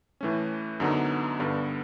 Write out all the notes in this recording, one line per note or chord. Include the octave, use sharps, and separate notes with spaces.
A2 E3 A3 C#4
F#2 D3 F#3 B3 D#4
G2 D3 G3 B3